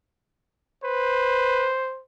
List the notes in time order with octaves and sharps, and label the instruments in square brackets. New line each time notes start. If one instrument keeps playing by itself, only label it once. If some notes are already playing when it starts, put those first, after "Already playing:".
[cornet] B4 [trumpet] C5